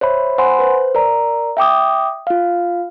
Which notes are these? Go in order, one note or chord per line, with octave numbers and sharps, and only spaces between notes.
C5 C#5 E5 B5
C5 F#5 G#5 B5 C6
B4 C5
A#4 D5 A#5
E5 G5 D6 D#6
F4 F5